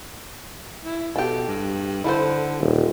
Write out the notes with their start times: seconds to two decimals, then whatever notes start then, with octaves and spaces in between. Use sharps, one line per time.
0.85 E4
1.16 B2 G4 A4
1.48 G2
2.04 D3 E4 A4 C5
2.60 D#1